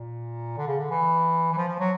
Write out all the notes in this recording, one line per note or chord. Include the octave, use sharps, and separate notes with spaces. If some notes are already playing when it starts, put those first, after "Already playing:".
Already playing: A#2
D3
C#3
D3
E3
E3
F3
F3
F#3